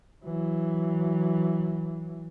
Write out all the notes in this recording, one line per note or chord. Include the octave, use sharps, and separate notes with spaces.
E3 F#3